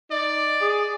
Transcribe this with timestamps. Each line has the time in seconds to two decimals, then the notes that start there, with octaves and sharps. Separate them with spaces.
0.11 D#4 D5
0.61 G#4